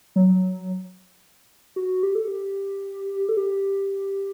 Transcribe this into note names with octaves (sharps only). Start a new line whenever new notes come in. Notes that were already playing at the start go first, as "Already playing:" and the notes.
F#3
F#4
G4
A4
G4
A4
G4